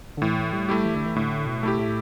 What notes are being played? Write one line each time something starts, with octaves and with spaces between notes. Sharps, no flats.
D3
A2 E3
G3
A3 E4 G4
E3
D3
E3
A2 D3
B2
A3 E4 G4
A2